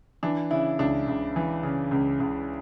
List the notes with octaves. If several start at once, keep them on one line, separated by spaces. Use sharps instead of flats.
E3 D4
C#3 E4
C#2 D4
C#2
E3
C#3
C#2
C#2